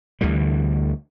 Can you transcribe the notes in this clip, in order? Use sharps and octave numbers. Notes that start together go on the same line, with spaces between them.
D2 D3 E3 G3